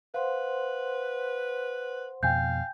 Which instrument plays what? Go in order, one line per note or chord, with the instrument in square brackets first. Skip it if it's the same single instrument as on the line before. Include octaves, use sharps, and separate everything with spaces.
[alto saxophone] B4 [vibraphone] C5 F#5 C6 [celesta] F5
[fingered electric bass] F2 B2 [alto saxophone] F5 [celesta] G5 G#5 G6